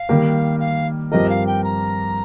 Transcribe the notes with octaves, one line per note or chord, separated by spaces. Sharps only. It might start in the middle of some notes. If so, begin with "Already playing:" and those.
Already playing: F5
D#3 G3 A#3 G4
F5
G2 F3 C4 G4 A#4 D#5
F5
G5
A#5